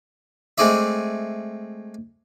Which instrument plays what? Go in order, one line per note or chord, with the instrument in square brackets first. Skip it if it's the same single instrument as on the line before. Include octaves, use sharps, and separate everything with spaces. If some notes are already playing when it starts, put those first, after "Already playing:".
[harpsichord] G#3 A3 C4 G#4 D5 E5